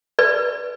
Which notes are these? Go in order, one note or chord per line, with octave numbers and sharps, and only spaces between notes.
B4 D5